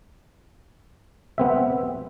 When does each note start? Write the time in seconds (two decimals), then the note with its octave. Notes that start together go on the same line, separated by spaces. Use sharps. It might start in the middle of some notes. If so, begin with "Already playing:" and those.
1.38 B3 C4 E5